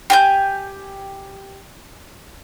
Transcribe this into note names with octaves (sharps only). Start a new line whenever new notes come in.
G4 G#5 G6